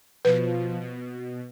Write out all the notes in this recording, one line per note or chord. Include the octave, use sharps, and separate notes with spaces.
B2 F3 B4
B2